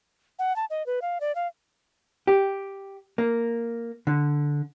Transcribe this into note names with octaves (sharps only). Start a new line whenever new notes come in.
F#5
A5
D#5
B4
F5
D5
F5
G4
A#3
D3